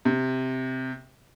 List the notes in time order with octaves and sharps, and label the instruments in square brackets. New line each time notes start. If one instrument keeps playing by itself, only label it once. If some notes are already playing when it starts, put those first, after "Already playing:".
[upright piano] C3